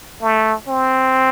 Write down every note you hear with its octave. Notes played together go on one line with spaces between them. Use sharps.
A3
C4